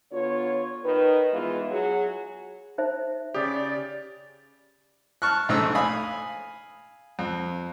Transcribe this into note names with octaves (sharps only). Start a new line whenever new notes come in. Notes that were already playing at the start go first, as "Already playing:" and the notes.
D3 B3 F4 C#5
D#3 D#4 B4
E3 G#3 B3 F4
F#3 F#4 G#4
D#4 C5 E5
C#3 G4 D5 D#6
A5 C#6 F6 F#6
A#1 G#2 A3 E6
F5 G#5 B5 D#6
F2